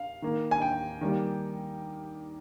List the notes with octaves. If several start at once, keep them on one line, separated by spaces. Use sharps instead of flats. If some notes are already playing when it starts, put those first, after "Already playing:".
Already playing: F5
D#3 A#3
G#5
G5
D#3 G3 A#3